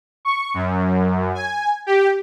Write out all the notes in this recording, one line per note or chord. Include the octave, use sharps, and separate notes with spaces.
C#6
F#2
G#5
G4